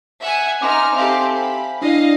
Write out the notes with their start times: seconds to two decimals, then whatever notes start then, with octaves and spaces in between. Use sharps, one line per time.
0.21 E5 F#5 G#5
0.62 D#4 G#5 C6 D6 F6
0.95 C4 G4 A4 E5 F5 G#5
1.35 B5
1.82 D4 E4 D5 D#5 F5